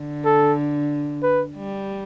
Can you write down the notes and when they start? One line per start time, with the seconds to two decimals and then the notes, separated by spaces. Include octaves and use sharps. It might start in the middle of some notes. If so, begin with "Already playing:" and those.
Already playing: D3
0.25 A4
1.23 B4
1.56 G3